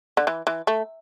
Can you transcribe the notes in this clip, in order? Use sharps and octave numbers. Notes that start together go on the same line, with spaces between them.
D3
E3
E3
A3